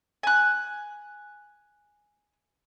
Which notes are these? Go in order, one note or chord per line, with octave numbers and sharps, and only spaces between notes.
G#5 F#6